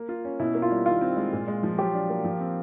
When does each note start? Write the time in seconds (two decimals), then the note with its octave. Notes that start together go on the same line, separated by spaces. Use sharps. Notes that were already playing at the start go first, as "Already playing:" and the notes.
Already playing: A#3
0.09 F4
0.25 C#4
0.40 B2 E4
0.55 A#3
0.62 F4
0.71 G3
0.86 D#3 F4
1.01 C4
1.17 G#3
1.33 A#2
1.48 G#3
1.63 F3
1.78 F#3 G4
1.94 D4
2.10 A#3
2.25 F3
2.40 C4